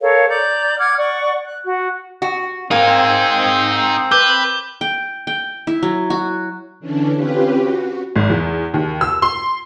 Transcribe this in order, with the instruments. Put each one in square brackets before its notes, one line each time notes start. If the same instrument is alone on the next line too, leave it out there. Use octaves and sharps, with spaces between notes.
[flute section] A4 A#4 C#5 F5
D5 A#5 D6 G6
F#5 D6 F6 G#6
D5 F#5 C#6
F#6
F#4
[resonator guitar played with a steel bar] F#4
[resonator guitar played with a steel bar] A#3 [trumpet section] C4 [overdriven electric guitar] D#4 G#4
[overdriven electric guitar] B4 [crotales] D6 G6 G7
[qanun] G5
G5
E4
F#3
F#4
[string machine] D3 E3 C#4 D4
C4 C#4 F4 G4 B4
F#4
[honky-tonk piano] G#1
E2
D#2
E6
C6